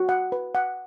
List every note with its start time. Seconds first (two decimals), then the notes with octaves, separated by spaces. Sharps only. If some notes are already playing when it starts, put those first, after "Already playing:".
Already playing: F#4
0.09 F#5
0.32 B4
0.55 F#5